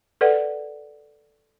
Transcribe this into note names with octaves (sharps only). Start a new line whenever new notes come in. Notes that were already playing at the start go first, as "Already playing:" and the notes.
A4 B4 D5 F#5